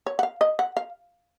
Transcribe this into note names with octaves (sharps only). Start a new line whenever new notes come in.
C#5
F#5
F5
D#5
F#5
F5